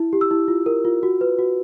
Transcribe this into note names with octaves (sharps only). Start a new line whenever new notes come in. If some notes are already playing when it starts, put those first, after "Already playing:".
Already playing: E4
G4
E6
E4
F4
A#4
F4
F#4
B4
F#4